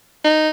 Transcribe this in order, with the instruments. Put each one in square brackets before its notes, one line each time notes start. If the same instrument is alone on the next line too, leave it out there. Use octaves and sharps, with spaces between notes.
[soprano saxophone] D#4